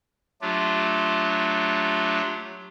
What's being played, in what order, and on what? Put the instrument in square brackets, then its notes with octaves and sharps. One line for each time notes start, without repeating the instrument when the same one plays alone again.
[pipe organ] F#3 A3 D4 F4 G4